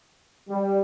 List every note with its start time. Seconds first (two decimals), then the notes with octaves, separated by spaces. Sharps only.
0.50 G3